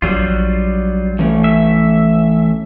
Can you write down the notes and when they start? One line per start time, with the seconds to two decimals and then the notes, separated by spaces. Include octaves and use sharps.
0.02 A#1 F#3 G3 F4
1.19 E3 A3 C#4
1.44 E5